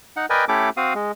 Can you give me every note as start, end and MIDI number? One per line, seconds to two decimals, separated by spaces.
0.17 0.26 63
0.17 0.26 78
0.30 0.45 70
0.30 0.45 71
0.30 0.45 74
0.30 0.45 75
0.30 0.45 79
0.30 0.45 80
0.48 0.70 57
0.48 0.70 61
0.48 0.70 64
0.48 0.70 67
0.48 0.70 69
0.48 0.70 86
0.77 0.94 60
0.77 0.94 66
0.77 0.94 77
0.77 0.94 87
0.95 1.12 56